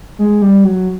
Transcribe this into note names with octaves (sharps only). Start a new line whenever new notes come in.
G#3
G3
F#3